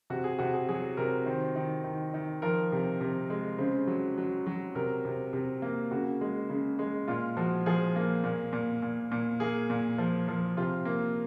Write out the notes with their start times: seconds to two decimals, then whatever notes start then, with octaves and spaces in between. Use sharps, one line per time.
0.10 C3 F#4
0.24 G#4
0.39 C3 F#4
0.54 G#4
0.69 F#3 G#4
0.97 C3 A#4
1.26 D#3 C5
1.56 D#3
1.84 D#3
2.14 D#3
2.42 F3 A#4
2.72 C3
3.01 C3
3.30 G#3
3.58 C#3 C5
3.87 F#3
4.18 F#3
4.46 F#3
4.75 C3 A#4
5.05 C3
5.33 C3
5.62 A#3
5.91 C#3 F#4
6.21 G#3
6.50 C#3
6.79 G#3
7.08 A#2 F4
7.37 F3 F#4
7.66 F3 G#4
7.96 A#3
8.24 A#2
8.53 A#2
8.82 A#2
9.12 A#2
9.40 A#3 G#4
9.70 A#2
9.98 F3
10.28 F3
10.57 C3 F4
10.85 A#3